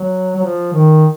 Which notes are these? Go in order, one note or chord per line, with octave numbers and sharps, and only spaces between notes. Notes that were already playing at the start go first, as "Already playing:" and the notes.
Already playing: F#3
F#3
F3
D#3